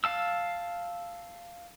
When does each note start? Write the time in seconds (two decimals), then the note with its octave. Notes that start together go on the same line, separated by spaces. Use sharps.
0.04 F5 A5 E6